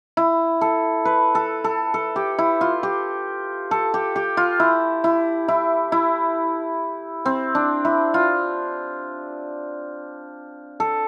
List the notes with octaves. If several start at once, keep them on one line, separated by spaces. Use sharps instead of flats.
E4
A4
B4
A4
A4
A4
G4
E4
F4
G4
A4
G4
G4
F4
E4
E4
E4
E4
C4
D4
E4
F4
A4